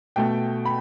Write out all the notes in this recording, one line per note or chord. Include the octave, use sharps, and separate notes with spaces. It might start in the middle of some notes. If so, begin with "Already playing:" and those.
B2 A3 G5
B5